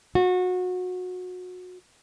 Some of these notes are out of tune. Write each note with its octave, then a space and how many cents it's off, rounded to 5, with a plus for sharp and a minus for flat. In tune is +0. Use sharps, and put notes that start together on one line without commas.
F#4 -25